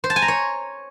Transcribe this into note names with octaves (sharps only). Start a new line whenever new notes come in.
C5
A5
G#5
A#5
C#5